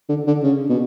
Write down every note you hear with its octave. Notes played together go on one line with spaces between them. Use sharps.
D3
D3
C#3
B2